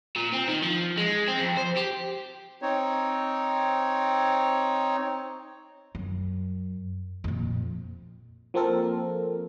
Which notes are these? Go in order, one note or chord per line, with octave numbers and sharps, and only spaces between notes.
A#2
C4
D#3
F3
G#3
C4
F2
C5
G4
C4 D#4 C#5
F#2
F2 A#2
F3 A#3 C4 A4 A#4